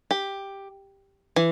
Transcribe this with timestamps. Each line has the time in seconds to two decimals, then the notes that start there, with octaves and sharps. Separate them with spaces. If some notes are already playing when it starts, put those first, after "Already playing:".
0.11 G4
1.36 E3